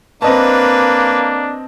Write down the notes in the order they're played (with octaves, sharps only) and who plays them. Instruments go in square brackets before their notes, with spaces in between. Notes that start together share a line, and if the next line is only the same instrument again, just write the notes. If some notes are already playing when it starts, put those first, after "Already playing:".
[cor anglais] A#3 [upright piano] C4 D#5 A5 [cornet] D4 [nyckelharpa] B4